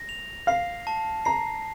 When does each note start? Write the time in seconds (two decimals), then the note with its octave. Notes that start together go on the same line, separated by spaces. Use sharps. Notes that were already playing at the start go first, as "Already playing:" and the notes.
Already playing: A#6
0.09 F7
0.47 F5 C7
0.87 A5
1.25 A#5 C7